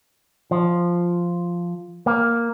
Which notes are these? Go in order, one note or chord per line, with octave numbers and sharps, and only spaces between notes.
F3
A#3